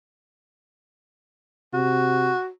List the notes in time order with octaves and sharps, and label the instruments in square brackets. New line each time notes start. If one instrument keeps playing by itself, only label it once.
[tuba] C3 [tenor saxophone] F#4